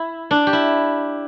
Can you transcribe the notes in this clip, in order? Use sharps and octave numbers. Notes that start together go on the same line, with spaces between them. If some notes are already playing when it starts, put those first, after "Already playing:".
Already playing: E4
D4
G4
E4